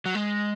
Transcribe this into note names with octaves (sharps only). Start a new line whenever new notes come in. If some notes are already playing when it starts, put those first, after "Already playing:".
F#3
G#3